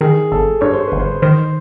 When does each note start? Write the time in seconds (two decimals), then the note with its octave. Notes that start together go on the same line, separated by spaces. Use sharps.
0.01 D#3 G#4
0.32 G1 A4
0.61 G2 C#5
0.73 C5
0.87 G1 B4
1.00 C5
1.22 D#3 C5